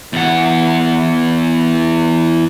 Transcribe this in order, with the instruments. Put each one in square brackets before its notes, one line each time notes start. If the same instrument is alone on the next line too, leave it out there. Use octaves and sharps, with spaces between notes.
[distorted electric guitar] E2 F#5